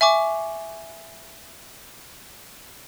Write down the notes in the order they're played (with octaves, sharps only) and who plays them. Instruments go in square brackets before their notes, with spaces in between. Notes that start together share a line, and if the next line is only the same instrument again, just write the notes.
[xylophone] E5 G#5 C#6 D6